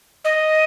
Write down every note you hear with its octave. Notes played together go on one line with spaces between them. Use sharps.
D#5